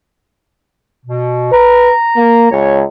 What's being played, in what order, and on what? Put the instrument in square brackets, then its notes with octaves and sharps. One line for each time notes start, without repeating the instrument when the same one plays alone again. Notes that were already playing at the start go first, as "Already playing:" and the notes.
[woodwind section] B2
[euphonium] B4 [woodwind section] A#5
[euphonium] A#3
[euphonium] C#2 [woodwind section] C#5